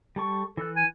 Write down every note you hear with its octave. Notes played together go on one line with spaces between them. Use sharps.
G3 A4 C#6
E3 A4 F#6
G#5